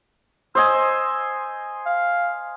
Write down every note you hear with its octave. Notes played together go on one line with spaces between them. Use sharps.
C5 D#5 G#5 E6
F5